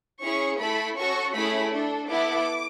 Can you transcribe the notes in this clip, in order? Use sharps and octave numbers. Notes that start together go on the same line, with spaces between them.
C#4 E4 G#4 C#6
A3 E4 A4 B5
C#4 F#4 A4 C#6
A3 C#4 E4 G#4 B5
D4 A4
B3 E4 A4 D6